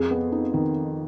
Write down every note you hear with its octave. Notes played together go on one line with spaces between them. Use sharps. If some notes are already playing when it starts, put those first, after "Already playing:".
Already playing: F2 G#4
B3
D#4
D#3